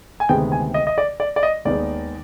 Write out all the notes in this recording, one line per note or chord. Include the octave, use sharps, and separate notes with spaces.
G#5
D2 C3 D#3 G#3 B3 G5
G#5
D#5
D#5
D5
D5
D5
D#5
D#2 D#3 G#3 B3 D5